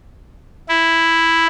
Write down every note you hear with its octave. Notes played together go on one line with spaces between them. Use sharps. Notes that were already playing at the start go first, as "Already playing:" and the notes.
E4